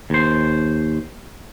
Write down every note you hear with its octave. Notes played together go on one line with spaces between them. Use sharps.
D#2 C5